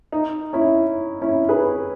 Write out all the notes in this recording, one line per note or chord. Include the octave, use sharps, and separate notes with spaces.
D#4
C#4 E4
C#4 E4
G#4 B4